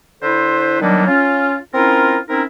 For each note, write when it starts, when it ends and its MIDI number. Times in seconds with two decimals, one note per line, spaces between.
0.22 0.80 50
0.22 0.80 64
0.22 0.80 69
0.22 0.80 71
0.22 0.80 72
0.81 1.07 51
0.81 1.07 54
0.81 1.07 55
0.81 1.07 58
0.81 1.07 59
0.81 1.07 62
1.07 1.57 61
1.07 1.57 65
1.74 2.19 60
1.74 2.19 61
1.74 2.19 64
1.74 2.19 65
1.74 2.19 70
2.29 2.43 60
2.29 2.43 61
2.29 2.43 63
2.29 2.43 64
2.29 2.43 70